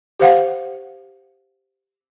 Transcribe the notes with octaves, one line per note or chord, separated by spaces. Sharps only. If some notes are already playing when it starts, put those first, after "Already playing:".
G4 C5 F5 F#5